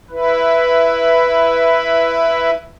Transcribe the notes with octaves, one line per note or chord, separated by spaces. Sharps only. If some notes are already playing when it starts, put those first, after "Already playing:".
E4 B4